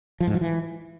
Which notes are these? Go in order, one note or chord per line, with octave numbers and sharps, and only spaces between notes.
F3
G#2
F3
E3